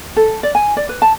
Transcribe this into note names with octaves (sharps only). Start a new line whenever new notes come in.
A4
D5
G#5
D5
B4
A5